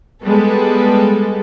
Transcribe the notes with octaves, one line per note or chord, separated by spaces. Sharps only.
G3 G#3 B3 A4